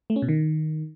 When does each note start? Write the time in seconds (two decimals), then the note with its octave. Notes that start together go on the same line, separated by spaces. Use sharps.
0.10 A3
0.16 C#4
0.22 B2
0.29 D#3